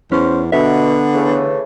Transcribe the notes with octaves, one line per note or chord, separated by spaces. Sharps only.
E2 C#4 C5
B2 D3 B3 E5
C#3 E3 A3